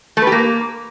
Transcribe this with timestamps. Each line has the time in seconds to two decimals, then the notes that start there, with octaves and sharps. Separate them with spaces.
0.17 A3
0.22 B4
0.27 G4
0.32 A#3